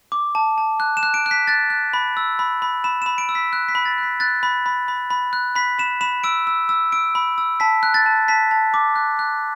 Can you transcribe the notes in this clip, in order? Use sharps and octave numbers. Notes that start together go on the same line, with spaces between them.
D6
A5
A5
F#6
E7
F#6
D7
F#6
B6
F#6 A6
F#6
B5
E6
B5
B5
B5 E7
E7
B5
D7
E6
B6
F#6
B6
B5
A6
F#6
B6
F#6 A6
B5
B5
B5
B5
F#6
B5 B6
B5 E7
B5 E7
E6 D7
E6
E6
E6 D7
B5
E6
A5 B6
F#6
A6
A5
A5 B6
A5
D6
F#6
F#6